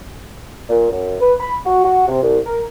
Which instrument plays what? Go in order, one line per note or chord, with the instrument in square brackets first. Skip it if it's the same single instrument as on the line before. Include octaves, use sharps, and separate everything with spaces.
[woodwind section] A#2
F#2
B4
B5
F#4
F#4
C3
C2
A#4